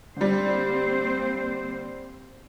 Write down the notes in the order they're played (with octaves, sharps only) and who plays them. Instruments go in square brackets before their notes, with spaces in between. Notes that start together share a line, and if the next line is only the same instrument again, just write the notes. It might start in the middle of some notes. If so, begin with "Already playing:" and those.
[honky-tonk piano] D3 G3 [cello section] A#3 C4 C5